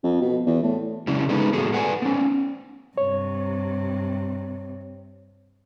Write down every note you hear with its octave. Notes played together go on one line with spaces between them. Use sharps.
F2
B2
E2
A2
C#3 F#3 C#4 E4 G4
G#3 B3 D#4 G#4 A4 B4
A2 B3 F#4 G#4 A4
A4 B4 F#5 G#5
B3 C#4
G2 C3 C#5